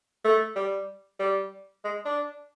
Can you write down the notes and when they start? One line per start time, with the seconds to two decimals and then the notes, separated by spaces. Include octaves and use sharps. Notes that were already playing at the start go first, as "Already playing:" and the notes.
0.25 A3
0.56 G3
1.20 G3
1.85 G#3
2.05 D4